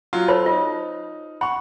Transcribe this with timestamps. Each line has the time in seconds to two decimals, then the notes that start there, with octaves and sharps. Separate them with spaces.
0.13 F#3 F4
0.28 A4 C5 C#5 B5
0.46 D#4 F4
1.41 F#5 B5 C#6